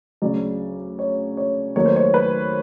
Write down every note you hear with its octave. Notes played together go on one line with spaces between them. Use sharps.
D2 C#3 F#3 D5
C#5
C#5
D#2 D#3 F#3 A3 C#5
C5
C#5
B4